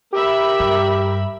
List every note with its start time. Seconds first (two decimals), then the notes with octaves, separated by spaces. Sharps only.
0.13 G4 A#4 E5 B5
0.60 G2